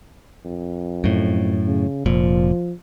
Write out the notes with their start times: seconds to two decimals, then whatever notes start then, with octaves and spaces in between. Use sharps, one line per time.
0.45 F2
1.04 F#2 A2
1.67 C#3
2.06 F1 A#2 F3